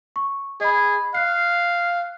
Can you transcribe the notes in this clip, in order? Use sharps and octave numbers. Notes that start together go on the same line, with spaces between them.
C#6
G#4 D#5 B5
F5 F#6 C7